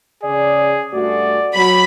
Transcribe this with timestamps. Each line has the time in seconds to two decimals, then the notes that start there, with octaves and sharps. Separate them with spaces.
0.24 C#3 G#4 D5
0.93 G2 A3 F#4 D5
1.55 F#3 B5